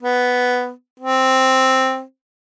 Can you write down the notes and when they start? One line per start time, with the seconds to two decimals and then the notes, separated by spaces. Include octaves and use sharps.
0.03 B3
1.00 C4